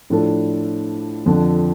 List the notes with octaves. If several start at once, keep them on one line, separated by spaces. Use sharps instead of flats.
A2 F3 D4 A4
F2 D3 F3 D4